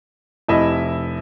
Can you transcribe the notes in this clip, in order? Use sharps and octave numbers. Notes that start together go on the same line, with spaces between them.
F1 E4 D#5 E5 B5